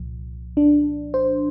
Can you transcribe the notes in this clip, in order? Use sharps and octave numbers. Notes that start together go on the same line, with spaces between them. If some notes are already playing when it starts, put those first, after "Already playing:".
Already playing: C2 A#2 F3
D4
C5